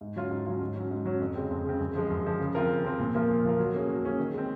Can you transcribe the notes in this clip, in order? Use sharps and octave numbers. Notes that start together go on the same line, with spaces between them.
G#2
F#3 C#4 F4
G#2
F#3 C#4 F4
G#2
F#3 C#4
G#2
F#3 C#4
F2
C#3 G#3 C4
F2
C#3 G#3 C4
F#2
F3 G#3
F#2
F3 G#3
C#3
F3 C4 F4 A#4
C#3
F3 C4 F4 A#4
A#2
F3 A#3 F4 A#4
A#2
F3 A#3 F4 A#4
F#3
A#3 C#4 G#4
F#3
A#3 C#4 G#4
D#3
G#3 C4